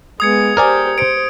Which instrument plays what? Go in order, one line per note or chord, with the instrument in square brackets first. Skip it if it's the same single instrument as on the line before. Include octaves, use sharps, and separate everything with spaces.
[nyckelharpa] G#3 B3 [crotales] D#6 G#6 C#7
[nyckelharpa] G4 C5 [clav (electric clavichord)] A#4 D5 G#5
[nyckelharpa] C5 [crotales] C#7 D7